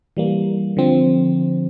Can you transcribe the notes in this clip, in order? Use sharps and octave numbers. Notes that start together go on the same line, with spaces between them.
E3 G3 A#3
D3 F3 C4